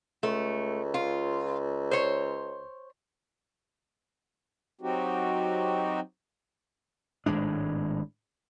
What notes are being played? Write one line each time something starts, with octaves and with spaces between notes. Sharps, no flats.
C#2 A3
F4
C5 C#5
F#3 C4 D#4 F#4 G4
G#1 A2 G#3 D4